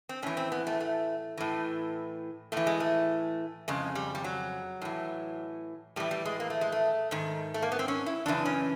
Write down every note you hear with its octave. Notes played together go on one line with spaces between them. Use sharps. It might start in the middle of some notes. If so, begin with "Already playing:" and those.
C4
A2 E3 C#4
C4
B3
A3
A3
A2 E3
A2 E3 A3
G#3
A3
F2 C#3 G#3
G3
G3
F#3
A2 E3
A2 E3 G3
G3
G#3
A#3
A3
G#3
A3
G#2 D#3
A3
A#3
B3
C4
C#4
E4
F#2 C#3 E3 D4
C#4